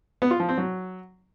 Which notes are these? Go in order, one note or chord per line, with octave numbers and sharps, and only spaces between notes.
B3
F4
F3
C4
F#3